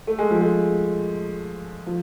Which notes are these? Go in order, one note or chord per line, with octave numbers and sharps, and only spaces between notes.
A3
G#3
F3
G#3
F3